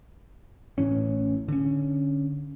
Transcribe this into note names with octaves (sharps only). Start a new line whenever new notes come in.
A1 A2 E3 C#4
D3 C#4